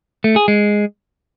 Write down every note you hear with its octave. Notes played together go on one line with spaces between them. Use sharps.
A3
G#4
G#3